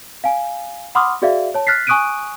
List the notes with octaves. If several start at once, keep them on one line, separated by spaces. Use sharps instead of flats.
F5 G#5
F#5 B5 C6 D6 D#6 F6
F#4 G#4 D5 E5 F5
C#5 A5
F6 F#6 A6 B6 C7
G#5 C#6 D#6 F#6 D7 D#7